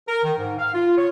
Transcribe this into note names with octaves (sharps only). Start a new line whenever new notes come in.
A#4
D#3
G#2
F5
F4
C#5